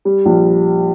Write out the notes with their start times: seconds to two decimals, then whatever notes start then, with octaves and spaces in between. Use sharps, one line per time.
0.05 G3
0.26 A#1